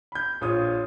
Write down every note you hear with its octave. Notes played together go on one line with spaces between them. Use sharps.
B5 G6
A#1 F4 C#5 D#6